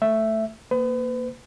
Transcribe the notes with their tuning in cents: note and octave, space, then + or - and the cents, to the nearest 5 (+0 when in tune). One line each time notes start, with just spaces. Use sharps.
A3 +0 E5 +5
A#3 +0 B4 +40